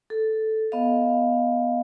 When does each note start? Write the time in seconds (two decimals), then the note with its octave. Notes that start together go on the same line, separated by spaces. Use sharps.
0.10 A4
0.72 B3 D#5 F5